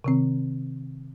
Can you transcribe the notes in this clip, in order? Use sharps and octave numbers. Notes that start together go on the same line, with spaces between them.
C3 D#3 C4